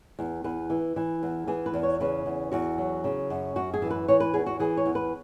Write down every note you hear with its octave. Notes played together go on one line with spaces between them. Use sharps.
E2
E2 B4
E3
E3
E2
E3 G#4
B4
E2
C#5
C#3 B4
E2
E2 F#4
F#3
C#3
F#2
F#2 F#4
G#4
E3
B4
E3 C#5
B4
E2 G#4
F#4
E3 G#4
C#5
E2
B4